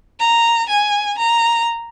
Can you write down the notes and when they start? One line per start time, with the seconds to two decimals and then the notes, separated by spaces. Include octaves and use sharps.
0.19 A#5
0.69 G#5
1.18 A#5